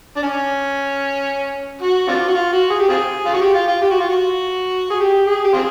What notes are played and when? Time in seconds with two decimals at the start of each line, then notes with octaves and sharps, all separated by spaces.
0.16 D4
0.22 C#4
1.82 F#4
2.08 C4 D4 F4
2.28 F#4
2.35 F4
2.52 F#4
2.70 G#4
2.79 G4
2.89 C4 F4 G#4
3.25 F4
3.33 F#4
3.41 G4
3.54 F4
3.67 F4
3.81 G4
3.90 F#4
4.00 F4
4.09 F#4
4.90 G#4
5.00 G4
5.26 G#4
5.44 G4
5.53 C4 F4 G#4